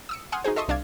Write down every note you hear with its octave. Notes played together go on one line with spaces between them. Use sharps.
D#6 E6 C#7
F#5 G#5 C6 D#6 F6
D#4 F#4 G#4 C5
A4 D#5 E5 C6 C#6 D#6
C2 D4 D5 F5 G#6